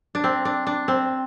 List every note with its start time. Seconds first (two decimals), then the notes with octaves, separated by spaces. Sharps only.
0.15 D4
0.24 C4
0.45 D4
0.67 D4
0.88 C4